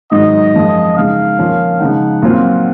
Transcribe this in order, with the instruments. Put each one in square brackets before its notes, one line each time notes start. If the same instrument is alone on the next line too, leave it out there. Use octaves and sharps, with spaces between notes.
[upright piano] G#2 D#3 F#3 [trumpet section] D#5
[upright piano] F#2 F3 G#3
[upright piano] C#3 G#3 D#4 [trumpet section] F5
[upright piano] A#2 F3 A#3 C#4 F4
[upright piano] C#3 F3 G#3 D#4 [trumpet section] F#5
[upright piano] A#2 F#3 C4 F4